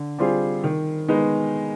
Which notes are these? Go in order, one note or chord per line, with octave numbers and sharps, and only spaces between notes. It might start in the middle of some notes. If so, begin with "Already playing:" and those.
Already playing: D3
G3 C4 F4 G#4
D#3
G#3 B3 D#4